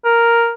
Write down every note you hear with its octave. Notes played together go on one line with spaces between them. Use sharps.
A#4